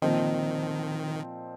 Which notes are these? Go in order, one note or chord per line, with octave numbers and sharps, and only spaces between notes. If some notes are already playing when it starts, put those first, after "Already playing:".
A#2 D#3 F3 C4 D#4